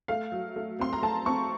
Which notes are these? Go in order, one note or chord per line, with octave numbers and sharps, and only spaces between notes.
A3 F5
F#3
A3
C4 C6
A#5
A3 A5
C4 C#6